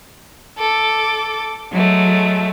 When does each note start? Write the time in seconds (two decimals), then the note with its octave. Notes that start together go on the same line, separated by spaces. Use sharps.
0.57 A4 D6
1.70 F#3 G#3 A3